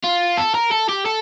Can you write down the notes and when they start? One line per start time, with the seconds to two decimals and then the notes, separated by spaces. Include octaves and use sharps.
0.04 F4
0.38 A4
0.55 A#4
0.72 A4
0.89 G4
1.06 A4